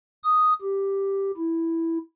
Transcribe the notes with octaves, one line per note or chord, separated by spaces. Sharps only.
D#6
G4
E4